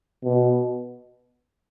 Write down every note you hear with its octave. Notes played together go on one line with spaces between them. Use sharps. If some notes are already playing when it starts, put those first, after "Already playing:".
B2